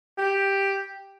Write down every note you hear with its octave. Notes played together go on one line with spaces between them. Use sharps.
G4